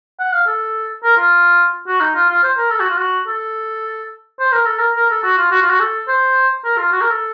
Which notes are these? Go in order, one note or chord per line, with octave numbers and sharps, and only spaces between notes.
F#5
F5
A4
A#4
F4
F#4
D#4
F4
F4
C5
A#4
A4
F#4
F4
F#4
A4
C5
A#4
A4
A#4
A#4
A4
F#4
F4
F#4
F4
F#4
A4
C5
A#4
F4
F#4
A#4
A4